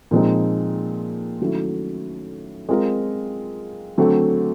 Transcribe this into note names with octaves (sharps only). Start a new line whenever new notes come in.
A#2 F3 G#3 C4 D#4
D#3 F#3 A3 C#4 E4
G#3 C4 F4 A#4
D3 F#3 A3 C4